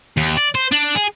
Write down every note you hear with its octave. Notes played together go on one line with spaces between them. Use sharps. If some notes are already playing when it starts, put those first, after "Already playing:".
D#2
D5
C5
D4
G#4